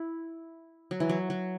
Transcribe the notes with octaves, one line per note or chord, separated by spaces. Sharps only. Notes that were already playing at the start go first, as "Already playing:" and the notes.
Already playing: E4
F#3
E3
F#3
F#3